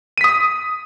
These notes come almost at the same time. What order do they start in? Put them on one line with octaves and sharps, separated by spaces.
D#7 B6 D#6